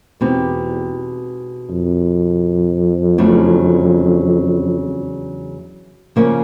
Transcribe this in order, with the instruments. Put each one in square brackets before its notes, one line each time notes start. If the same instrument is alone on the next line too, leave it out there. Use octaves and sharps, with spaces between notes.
[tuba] E2 [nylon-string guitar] B2 G#3 C4 D#4 G4
[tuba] F2
[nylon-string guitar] E2 C#3 F#3 A3 D4
C#3 F3 A#3 C#4